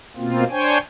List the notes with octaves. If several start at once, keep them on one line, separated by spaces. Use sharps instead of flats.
B2 A#3 C4 F4
D4 C5 C#5 G5 G#5